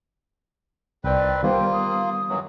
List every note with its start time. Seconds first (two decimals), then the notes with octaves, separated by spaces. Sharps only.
1.04 C2 D#3 C4 B4 D5 G5
1.43 D#3 G3 A#3 B3 F4 A#4 C5 G5
1.71 D#6
2.29 F#2 E3 F#3